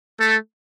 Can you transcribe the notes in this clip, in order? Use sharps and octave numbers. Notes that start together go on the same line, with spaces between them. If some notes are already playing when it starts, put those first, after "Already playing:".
A3 A4